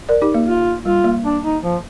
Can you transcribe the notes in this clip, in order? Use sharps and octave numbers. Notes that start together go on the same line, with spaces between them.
A#4 D5
D#4 G4
A#3
F4
G3 F4
A#3
D4
D#4
F3